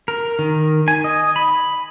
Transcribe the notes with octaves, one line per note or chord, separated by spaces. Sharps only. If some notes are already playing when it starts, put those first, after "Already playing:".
A#4
D#3
G#5
D#5
B5